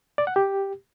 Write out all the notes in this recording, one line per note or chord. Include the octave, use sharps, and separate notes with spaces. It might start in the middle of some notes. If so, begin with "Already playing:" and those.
D5
F#5
G4